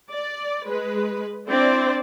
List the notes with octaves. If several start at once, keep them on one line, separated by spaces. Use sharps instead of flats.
D5
G#3 B4
C4 D4 E4 C5 D5